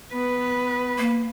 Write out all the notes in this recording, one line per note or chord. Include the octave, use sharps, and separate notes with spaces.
B3 B4
A#3